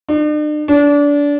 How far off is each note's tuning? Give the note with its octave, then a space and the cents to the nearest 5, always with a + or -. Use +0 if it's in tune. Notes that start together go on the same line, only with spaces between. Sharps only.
D4 +45
D4 -25